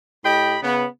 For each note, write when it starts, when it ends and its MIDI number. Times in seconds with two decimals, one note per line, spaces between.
0.25 0.56 45
0.25 0.56 67
0.25 0.56 75
0.25 0.56 79
0.25 0.56 83
0.63 0.85 49
0.63 0.85 59